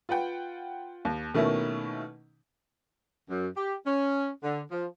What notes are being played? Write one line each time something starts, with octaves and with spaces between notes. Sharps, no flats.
F4 B4 F#5 G5
D#2
B2 D#3 A3 A#3 C#4 E4
F#2
G4
C#4
D3
F3